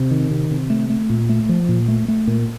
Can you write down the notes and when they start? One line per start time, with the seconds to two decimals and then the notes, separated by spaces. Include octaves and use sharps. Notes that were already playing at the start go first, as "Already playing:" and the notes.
Already playing: C3
0.11 D#3
0.31 C3
0.51 C3
0.70 A3
0.90 A3
1.10 A#2
1.29 A3
1.49 F3
1.69 A#2
1.88 A3
2.08 A3
2.27 A#2